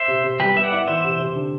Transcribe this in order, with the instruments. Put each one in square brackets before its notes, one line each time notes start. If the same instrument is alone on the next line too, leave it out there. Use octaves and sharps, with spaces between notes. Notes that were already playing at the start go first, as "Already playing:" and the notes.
Already playing: [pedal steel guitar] C5 E5
[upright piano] C3
C3
[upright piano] G3 [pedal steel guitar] G4 B4
[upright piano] B3 [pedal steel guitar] E5
[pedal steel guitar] D5 F#5
[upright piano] E4
[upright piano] E3 [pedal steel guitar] C5 E5
[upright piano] C3
C3
D3